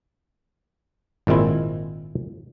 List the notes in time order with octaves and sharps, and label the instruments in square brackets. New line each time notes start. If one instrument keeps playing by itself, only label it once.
[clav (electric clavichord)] G#1 A#2 G#3 C4 E4